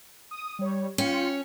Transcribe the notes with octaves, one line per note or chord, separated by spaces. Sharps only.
D#6
G3 C#5
C#4 F4 G5 C#7